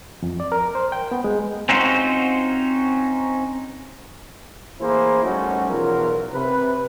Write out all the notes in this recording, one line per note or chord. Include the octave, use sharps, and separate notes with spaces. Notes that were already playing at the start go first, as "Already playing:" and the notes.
F2
D5
A#4
C5
G5
B3
G#3
C4 C#4 D#4 F4 F#4 C5
A1 A#3 E4 G#4 C5
F#3 G3 A3 C#4 D#4 F#4
B1 E2 F3 F#3 F4 A#4
C3 B4